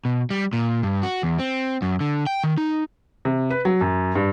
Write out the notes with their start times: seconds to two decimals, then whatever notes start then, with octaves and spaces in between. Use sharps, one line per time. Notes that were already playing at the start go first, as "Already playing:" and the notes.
0.05 B2
0.31 G3
0.53 A#2
0.83 G2
1.03 F#4
1.23 E2
1.39 C4
1.82 F#2
2.01 D3
2.27 G5
2.44 D#3
2.58 D#4
3.25 C3
3.50 B4
3.65 F#3
3.81 F#2
4.15 G2